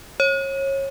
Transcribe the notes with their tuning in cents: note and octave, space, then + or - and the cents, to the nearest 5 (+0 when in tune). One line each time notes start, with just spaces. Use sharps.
C#5 -25